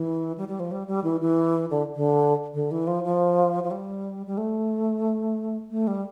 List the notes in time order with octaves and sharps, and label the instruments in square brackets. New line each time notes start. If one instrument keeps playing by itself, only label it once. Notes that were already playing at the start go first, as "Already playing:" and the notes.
Already playing: [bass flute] E3
G3
G3
F3
G3
G3
E3
E3
D3
D3
D3
E3
F3
F3
F3
G3
G3
A3
A3
G3